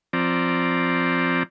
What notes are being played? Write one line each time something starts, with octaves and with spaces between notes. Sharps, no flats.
F3 C4 D5 A#5